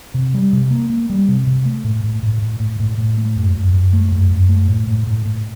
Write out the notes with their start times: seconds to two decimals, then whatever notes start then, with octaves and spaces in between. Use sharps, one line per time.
0.14 C3
0.34 G3
0.53 C3
0.71 A#3
0.90 A#3
1.10 G3
1.28 C3
1.47 C3
1.65 A3
1.84 A2
2.04 A2
2.22 A2
2.42 A2
2.60 A2
2.79 A2
2.98 A2
3.18 A3
3.36 F#2
3.55 F#2
3.74 F#2
3.93 A3
4.12 F#2
4.31 F#2
4.49 A3
4.68 A2
4.87 A2
5.07 A2
5.25 A2